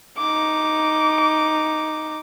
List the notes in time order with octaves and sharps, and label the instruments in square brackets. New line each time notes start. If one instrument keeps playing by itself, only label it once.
[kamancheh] D#4 D6